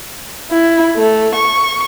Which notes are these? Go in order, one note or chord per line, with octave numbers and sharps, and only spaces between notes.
E4
A3
C#6